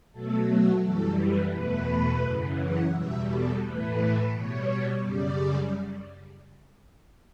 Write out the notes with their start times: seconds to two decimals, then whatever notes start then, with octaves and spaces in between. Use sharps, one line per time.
0.12 B2 F#3 A3 A4
0.47 F#4
0.82 F#2 E3 G3 A4
1.17 B4
1.52 E2 B2 A3 B4
2.22 F#2 C#3 E3
2.57 F#5
2.92 E2 B2 G3 E5
3.26 A4
3.61 A2 E3 A3 B4
4.31 B2 G3 C#5
5.01 F#2 C#3 G3 D5